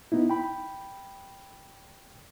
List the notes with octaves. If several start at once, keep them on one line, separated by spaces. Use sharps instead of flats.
B3 D#4 E4
G5 B5